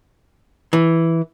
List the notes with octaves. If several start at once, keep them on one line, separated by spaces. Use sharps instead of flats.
E3